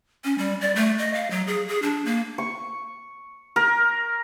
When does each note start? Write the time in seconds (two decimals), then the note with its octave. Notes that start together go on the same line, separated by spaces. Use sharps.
0.24 C#4
0.38 G3
0.61 D5
0.76 A3
0.98 D#5
1.14 F5
1.31 F#3
1.48 G#4
1.68 G#4
1.82 D4
2.05 A#3
2.38 C#6
3.56 A#4